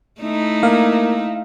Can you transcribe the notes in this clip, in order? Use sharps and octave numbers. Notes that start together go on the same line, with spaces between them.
A3 D#4 E4
A#3 F5